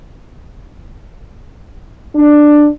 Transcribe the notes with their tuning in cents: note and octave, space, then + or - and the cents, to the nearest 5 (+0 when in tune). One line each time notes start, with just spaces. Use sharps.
D4 +10